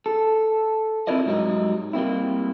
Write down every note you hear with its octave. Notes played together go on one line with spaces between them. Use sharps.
A4
C4 E4 F4 A#4 D5 D#5
G#2 F#3 G3 C#4 D#4
G3 A#3 C4 E4